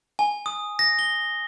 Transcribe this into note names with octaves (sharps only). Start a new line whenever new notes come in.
G#5
D#6
A#6
G7